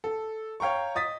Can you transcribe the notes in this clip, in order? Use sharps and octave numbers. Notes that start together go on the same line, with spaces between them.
A4
C#5 F5 G5 A#5 C#6
D#5 D#6 A6 B6